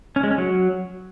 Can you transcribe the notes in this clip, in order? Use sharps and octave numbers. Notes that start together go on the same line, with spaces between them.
C#4
G#3
C#4
F#3